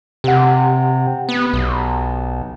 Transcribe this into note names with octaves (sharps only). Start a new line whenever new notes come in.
C3 G4 F#5
B3
B1